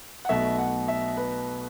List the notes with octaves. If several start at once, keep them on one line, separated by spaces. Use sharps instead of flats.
F#5
B1 B2 A3 E5
F#5
E5
B4